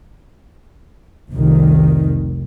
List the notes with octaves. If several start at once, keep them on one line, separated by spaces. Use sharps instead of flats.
F1 C2 D#3